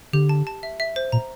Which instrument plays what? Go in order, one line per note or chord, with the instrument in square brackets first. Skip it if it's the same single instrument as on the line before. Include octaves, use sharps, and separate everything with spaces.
[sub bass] D3 [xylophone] G4
[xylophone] A5
A5
E5
E5
C5
[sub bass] A#2 [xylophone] A#5